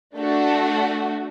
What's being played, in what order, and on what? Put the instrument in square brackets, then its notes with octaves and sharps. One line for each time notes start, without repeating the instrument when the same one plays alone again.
[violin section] A3 D4 F#4 A4